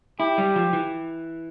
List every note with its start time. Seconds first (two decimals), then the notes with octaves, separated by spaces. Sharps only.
0.20 E4 G4
0.38 G3
0.56 F3
0.73 E3